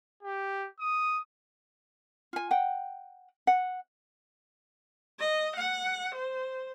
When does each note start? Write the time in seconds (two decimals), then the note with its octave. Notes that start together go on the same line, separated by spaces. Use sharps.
0.23 G4
0.79 D#6
2.33 F4 G#5
2.51 F#5 G5
3.47 F#5
5.19 D#5
5.56 F#5
6.15 C5